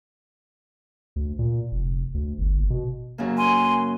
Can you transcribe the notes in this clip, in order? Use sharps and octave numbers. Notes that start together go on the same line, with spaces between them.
D2
A#2
F1
D2
G1
F#1
B2
F#2 C#3 A#3
G#5 C6